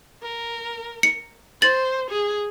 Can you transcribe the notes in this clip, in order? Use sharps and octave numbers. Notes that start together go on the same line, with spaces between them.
A#4
C#7
C5 A6 F#7
G#4